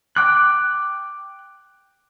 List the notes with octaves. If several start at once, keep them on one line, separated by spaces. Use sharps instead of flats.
G5 D6 F#6